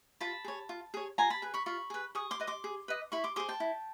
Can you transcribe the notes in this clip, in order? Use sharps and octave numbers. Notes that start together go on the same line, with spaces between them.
F4 A5 B5
G#4 C#5
F4
G#4 C#5
F4 G#5 A#5
A5 B5
G#4 B4
B5 C#6
F4 B5 C#6
G#4 B4
G#4 C#6 D#6
C6 D6
B4 D#5
C6 D6
G#4
B4 D#5
E4 B5 C#6
C6 D6
G#4 C5 C6 D6
G5 A5
E4